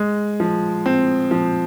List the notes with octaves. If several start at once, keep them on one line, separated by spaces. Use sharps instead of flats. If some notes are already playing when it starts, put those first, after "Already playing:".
Already playing: G#3
F3
C4
F3